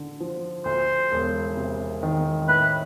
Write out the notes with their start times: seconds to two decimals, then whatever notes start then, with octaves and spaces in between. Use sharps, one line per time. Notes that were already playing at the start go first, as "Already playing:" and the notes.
Already playing: D3
0.20 F3
0.65 D2 C5
1.12 E1
1.57 C3
2.03 D#3
2.48 A2 B4